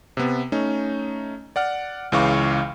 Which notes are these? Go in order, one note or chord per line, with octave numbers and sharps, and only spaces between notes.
C3 B3
A3 C#4 D#4
D5 F#5 F6
C#2 C#3 E3 F5 C#6 D6